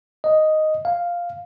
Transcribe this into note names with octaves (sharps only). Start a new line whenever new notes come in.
D#5
F5